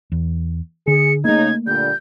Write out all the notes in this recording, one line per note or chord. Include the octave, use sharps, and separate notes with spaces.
E2
D3 G#4 C#7
C#3 A3 A#3 D#4 G#6
A#2 D3 G3 G6